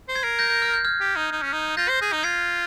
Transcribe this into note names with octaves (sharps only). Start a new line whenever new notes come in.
C5
G#6 C7
A#4
G6 A#6
G6
F6
G6
F6 G#6
G4
D#4
D#4
C#4
D#4
F4 G6 A#6
C5
G#4
D#4
F4 G#6 C7